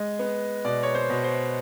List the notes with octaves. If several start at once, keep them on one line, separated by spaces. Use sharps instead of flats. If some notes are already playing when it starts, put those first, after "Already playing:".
Already playing: G#3 D#5
B3
B2 D5
C#5
C5
B2
C5